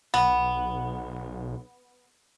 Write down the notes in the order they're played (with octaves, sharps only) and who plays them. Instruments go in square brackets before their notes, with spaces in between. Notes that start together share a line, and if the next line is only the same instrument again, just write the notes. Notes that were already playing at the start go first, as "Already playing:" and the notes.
[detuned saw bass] B1 [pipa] B3